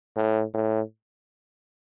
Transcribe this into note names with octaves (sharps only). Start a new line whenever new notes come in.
A2
A2